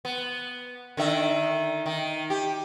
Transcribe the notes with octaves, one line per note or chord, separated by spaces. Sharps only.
B3
D3 D#3 E5
D#3
G4